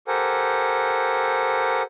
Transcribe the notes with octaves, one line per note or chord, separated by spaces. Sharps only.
G4 A4 A#4 C5 F#5 G#5